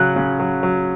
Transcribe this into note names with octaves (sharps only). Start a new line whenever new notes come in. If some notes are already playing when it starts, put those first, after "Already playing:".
Already playing: C#3 F#3 F#6
C#3
F#3
F#3